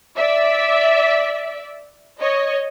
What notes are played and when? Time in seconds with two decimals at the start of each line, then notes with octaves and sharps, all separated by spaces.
0.16 D5 E5
2.19 C#5 D#5